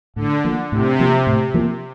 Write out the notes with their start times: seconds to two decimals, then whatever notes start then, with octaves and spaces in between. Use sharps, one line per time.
0.16 A2 D3
0.45 F3 A#3
0.72 A2 C3
1.00 F3 A#3
1.27 A2
1.54 F3 A#3